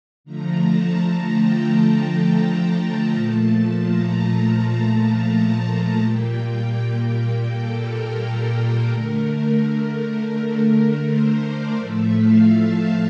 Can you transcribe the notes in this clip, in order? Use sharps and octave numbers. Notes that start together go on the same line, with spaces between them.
D3 F3 A3 A#5
A5
A5
G5
A#5
A#2 F3 A3 A5
A#5
A5
A#2 G3 A#3 G5
G5
A4
A#4
A4
A4
D3 A3 A#4
C5
D5
A2 F3 A3 E5
F5
A5